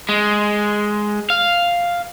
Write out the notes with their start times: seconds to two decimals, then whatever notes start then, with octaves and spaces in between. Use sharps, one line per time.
0.09 G#3
1.30 F5